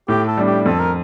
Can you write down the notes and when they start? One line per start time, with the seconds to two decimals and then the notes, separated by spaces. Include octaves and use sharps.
0.08 A2 G4
0.28 A4
0.37 G3 D4
0.47 G4
0.66 F2 A4
0.79 A#4